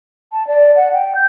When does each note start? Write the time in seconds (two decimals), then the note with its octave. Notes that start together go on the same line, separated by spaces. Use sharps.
0.32 A5
0.47 D5
0.76 F#5
0.93 G5
1.15 G6